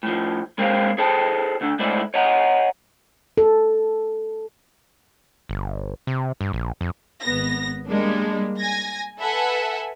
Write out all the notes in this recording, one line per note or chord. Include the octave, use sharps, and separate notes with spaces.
A2 F3
G#3 A#3 C4 G#4 C5 F5
G#4 A4 B4 C5 A5
D2 D3
G#2 A3 E4 C5 D5
C#5 D#5 F#5 A#5
A4
G1
C3
G2
A#1
F2
G#1 B3 A#6
G3 G#3 A#3 D4
G#5 G#6 A#6
A4 B4 E5 F#5 G#5